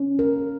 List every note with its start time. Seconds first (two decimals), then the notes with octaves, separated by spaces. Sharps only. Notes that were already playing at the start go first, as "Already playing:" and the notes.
Already playing: C#4
0.19 A#4